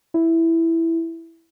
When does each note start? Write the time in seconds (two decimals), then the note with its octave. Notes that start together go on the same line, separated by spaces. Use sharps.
0.14 E4